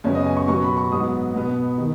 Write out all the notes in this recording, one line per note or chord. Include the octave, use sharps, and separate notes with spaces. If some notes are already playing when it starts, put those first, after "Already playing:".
F#2 C#3 B3 C#5
D#5
G#5
C#6
B2 F#3 B3 C#6
B5
C#6
G#2 F#3 B3 D#6
B2 B3
D#3